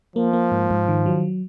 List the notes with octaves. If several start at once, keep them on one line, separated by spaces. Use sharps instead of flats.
F3 A#3
A#3
G#2
G#2
D#3
F#3